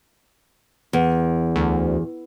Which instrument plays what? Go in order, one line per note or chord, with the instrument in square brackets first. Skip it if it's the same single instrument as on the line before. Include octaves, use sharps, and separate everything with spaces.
[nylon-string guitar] E2
[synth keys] D2